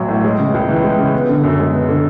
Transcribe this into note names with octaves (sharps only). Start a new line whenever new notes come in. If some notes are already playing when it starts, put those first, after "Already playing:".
Already playing: A1 F#3
A2
G#3
C#3
C#2
E3
G#3
C#3
B3
D3
F#2
G#3
B3
D3